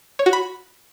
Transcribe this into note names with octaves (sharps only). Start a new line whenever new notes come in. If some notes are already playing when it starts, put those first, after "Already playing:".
C#5
F#4
B5